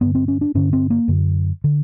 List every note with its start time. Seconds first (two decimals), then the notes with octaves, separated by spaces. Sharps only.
0.01 G2 D3 B3
0.15 C4
0.28 C#4
0.41 D4
0.55 G2 D3 C#4
0.73 C4
0.90 A#3
1.08 F#2 D3
1.64 D3